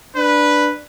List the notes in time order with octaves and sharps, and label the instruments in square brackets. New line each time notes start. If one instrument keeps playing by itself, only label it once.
[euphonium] D4 [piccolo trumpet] B4